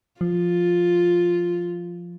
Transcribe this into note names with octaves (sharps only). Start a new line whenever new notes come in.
F3 F4